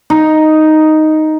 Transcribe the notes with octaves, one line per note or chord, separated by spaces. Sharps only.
D#4